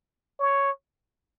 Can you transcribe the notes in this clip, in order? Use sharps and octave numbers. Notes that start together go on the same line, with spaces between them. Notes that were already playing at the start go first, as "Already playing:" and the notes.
C#5